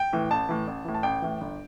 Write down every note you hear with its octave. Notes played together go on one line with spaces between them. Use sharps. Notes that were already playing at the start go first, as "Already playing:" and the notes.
Already playing: G5
A2 E3
A1 A5
A2 E3
A1
A2 E3
A5
A1 G5
A2 E3
G1